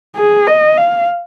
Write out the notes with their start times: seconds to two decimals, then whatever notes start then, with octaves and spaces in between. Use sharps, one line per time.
0.16 G#4
0.47 D#5
0.78 F5